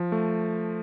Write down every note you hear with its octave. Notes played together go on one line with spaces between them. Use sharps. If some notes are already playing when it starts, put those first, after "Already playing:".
Already playing: F3
A3